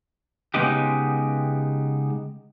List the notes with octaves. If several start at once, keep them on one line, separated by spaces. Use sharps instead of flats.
C#3 G#3 B3 D#4 G4